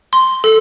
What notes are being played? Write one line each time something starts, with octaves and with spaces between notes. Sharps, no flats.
C6
A4